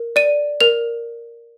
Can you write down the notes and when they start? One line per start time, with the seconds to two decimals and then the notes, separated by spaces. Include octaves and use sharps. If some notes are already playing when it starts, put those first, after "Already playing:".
Already playing: A#4
0.16 D5 D#7
0.61 A#4 F7